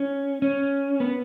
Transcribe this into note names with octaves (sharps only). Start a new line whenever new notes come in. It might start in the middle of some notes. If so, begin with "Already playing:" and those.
Already playing: C#4
C#4
B3